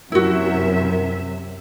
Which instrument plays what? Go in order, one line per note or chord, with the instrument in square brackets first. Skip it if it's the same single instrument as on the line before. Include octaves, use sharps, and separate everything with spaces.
[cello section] F#2 C3 E5 [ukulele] E4 F#4 [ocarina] A#4